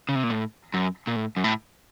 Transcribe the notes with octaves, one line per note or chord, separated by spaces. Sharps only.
C#3
C3
A#2
A2
F#2
A#2
A2
F#2
A2